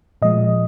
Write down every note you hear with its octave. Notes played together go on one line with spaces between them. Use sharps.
A#2 F3 G#3 D#5